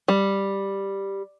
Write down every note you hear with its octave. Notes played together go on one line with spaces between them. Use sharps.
G3